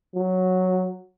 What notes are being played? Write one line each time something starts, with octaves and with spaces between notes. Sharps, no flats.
F#3